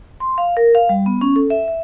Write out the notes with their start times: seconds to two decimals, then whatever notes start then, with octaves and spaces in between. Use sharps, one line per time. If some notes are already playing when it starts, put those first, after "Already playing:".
0.20 C6
0.38 F5
0.57 A#4
0.75 F5
0.89 G3
1.06 B3
1.21 C#4
1.36 A4
1.50 E5
1.68 E5